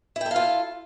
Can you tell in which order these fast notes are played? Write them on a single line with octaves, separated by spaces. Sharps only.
E4 G5 A4 F5 F4